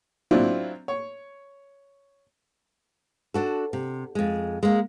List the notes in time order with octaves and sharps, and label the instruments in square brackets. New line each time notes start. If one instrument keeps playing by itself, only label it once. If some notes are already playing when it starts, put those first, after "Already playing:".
[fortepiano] F#3 C4 D4 E4 F4
C#5
[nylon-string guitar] D4 F#4 A4
C3
F2 G#3
G#3 A#3